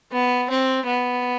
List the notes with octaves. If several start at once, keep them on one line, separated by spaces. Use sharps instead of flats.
B3
C4
B3